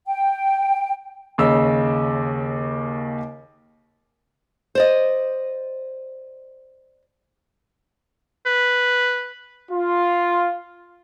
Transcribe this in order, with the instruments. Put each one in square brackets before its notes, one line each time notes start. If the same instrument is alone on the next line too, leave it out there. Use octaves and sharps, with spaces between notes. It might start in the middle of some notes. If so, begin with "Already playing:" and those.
[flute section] G5
[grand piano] D#2 C#3 D#5 E6
[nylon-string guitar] C5 D5 D#5
[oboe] B4
[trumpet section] F4